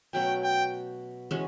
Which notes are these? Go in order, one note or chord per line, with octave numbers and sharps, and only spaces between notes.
B2 F#3 A3 C#4 G5
G5
E3 G#3 C#4 F#4